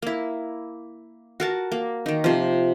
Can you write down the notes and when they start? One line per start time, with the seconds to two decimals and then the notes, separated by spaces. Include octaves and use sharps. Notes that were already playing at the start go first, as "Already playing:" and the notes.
0.02 A#3 E4
1.40 F#4 A#4 A5
1.72 A#3
2.06 D#3 D#4
2.24 C3 F3